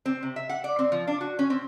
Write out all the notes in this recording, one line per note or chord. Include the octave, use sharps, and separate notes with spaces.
C4
C3
E5
F#5
D5
C4
F3
D4
F#4
C#4
C4